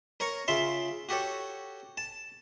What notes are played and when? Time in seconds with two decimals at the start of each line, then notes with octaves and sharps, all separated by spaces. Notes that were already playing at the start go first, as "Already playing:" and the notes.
0.20 A#4 C#5 A#5 C#6
0.48 C#3 F4 E5 C6
1.09 F#4 G4 A4 C#5
1.97 A5